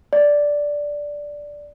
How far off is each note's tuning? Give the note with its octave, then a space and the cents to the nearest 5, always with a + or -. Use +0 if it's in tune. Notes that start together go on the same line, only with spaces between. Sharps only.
D5 -5